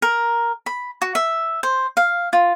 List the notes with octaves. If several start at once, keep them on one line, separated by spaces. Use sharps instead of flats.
A#4
B5
F#4
E5
C5
F5
F4